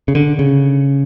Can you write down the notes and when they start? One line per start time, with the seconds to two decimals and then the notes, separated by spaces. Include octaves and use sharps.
0.08 C#3
0.15 D3
0.39 C#3